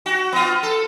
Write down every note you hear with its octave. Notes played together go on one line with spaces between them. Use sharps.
F#4
B3 F4
A4